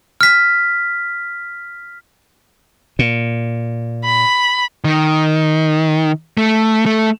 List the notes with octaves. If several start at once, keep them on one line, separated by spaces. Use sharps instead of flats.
F6 B6
A#2
B5
D#3
A3
A3